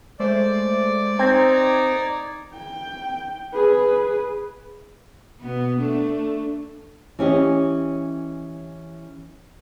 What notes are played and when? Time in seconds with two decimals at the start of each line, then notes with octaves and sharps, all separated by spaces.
0.19 G#3 A3 C5 D5
1.19 C4 D#4 G#6
2.53 G5
3.53 G#4 B4
5.41 B2 B3
5.79 A3 D4
7.19 E3 C#4 G4 D#5